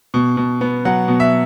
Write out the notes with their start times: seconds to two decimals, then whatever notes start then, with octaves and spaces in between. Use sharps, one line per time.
0.14 B2
0.37 B2
0.61 B3
0.85 F#3 F#5
1.08 B2
1.20 E5